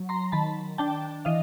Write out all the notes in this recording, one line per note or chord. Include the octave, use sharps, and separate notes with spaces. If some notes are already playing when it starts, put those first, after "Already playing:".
Already playing: F#3
A#5 C6
D#3 A5 B5
D4 G5 A5
E3 D#5 F5